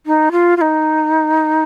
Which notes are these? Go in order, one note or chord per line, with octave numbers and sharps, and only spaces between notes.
D#4
F4
F4
D#4